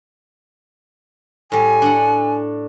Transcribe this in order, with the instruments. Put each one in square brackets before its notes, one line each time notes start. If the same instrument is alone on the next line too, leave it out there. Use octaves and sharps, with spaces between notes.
[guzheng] A2 G3 [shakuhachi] G#5
[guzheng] D4 A4 F#5